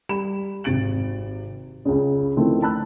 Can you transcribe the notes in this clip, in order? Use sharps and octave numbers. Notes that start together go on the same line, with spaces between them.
G3 B5 E7
G#1 C3 A6 D7 F#7
C#2 C#3
D3 D#3 F3 A3 C4 E4
A5 B5 E6 F#6